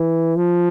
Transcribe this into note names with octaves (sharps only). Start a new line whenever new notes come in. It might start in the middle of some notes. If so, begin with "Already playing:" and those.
Already playing: E3
F3